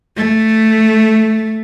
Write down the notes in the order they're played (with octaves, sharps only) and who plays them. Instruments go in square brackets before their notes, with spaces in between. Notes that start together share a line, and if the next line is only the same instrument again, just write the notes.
[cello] A3